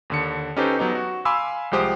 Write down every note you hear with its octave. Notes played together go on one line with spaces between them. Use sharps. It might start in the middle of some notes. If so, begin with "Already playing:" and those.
D#2 D3 C#7
C#4 D#4 G4 A4 B4 C5
F#3 B3 D#4
F#4
F5 G#5 B5 C6 D6 E6
C2 F3 G#3 G4 C5 D#6